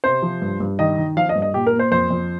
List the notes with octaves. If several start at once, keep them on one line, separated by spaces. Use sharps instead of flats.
C3 C5
F3
G2
G2
D#3 D#5
D#3
F3 F5
D#5
G2
D#5
A#2 G4
A#4
A#3
C5
F2 C5
F2